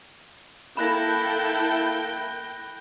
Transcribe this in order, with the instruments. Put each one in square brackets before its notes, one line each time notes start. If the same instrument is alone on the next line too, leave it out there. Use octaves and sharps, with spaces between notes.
[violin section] A#3 E4 A4 [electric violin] G5 [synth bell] B5 F#6 A#6